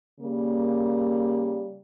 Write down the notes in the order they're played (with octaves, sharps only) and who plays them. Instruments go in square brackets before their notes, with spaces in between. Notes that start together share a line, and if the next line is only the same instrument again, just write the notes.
[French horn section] C#3 G3 A#3